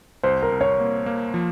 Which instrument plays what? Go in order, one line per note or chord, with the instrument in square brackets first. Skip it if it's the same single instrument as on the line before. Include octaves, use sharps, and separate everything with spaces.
[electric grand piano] C2 [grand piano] C5
[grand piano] A#4
[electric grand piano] C2
[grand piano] C#5
[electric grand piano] A#3
A#3
F3